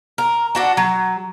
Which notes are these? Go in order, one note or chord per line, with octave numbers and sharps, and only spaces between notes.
A#4
D4 F#4 A4
F#3